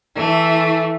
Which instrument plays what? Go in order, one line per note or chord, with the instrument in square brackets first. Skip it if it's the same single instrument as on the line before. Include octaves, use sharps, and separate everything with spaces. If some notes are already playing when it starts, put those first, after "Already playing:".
[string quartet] E3 A3